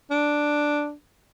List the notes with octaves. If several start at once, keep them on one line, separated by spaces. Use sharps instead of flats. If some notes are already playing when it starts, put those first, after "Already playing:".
D4